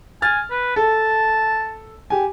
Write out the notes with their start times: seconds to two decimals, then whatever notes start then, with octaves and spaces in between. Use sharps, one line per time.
0.22 G#5 F6 A6
0.51 B4
0.76 A4 A5
2.10 G4 G#5